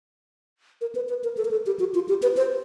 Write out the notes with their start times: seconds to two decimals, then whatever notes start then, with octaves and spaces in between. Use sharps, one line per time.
0.81 A#4
0.95 B4
1.09 B4
1.24 A#4
1.37 A4
1.45 A#4
1.51 A4
1.66 G4
1.80 F#4
1.95 F4
2.08 G4
2.23 B4
2.37 C5